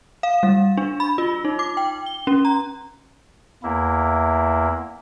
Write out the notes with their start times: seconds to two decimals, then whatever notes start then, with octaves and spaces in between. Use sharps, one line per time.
0.23 F5
0.43 G3
0.77 D4
1.00 B5
1.18 F4
1.45 D#4
1.59 D6
1.77 G5
2.06 G7
2.27 C#4
2.45 A#5
3.63 E2 A#3 E4